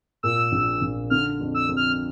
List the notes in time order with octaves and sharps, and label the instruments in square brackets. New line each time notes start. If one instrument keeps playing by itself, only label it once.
[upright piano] A#2 [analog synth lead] E6
[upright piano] A#1
A#1
[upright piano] D3 [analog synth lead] F6
[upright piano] F2
[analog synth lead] E6
[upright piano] F2
[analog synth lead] F6